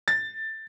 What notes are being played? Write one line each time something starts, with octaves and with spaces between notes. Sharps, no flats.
A6